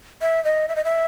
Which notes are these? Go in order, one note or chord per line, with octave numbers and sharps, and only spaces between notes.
E5
D#5
E5
D#5
E5